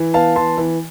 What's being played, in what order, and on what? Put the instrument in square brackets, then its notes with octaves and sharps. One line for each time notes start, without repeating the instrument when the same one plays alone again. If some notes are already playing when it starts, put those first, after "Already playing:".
Already playing: [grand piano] E3
B3 F5 A5
E3 A5 C6
E3